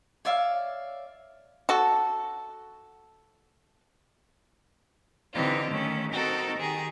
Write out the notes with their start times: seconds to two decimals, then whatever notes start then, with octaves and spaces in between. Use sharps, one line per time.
0.25 C#5 D5 E5 F5
1.69 F#4 A4
5.34 D3 E3 C4 D#4 F4 G4
5.69 D#3 A3 C#4
6.12 C4 D#4 F#4 A4 A#4 C5
6.59 D#3 G4 G#4 A#5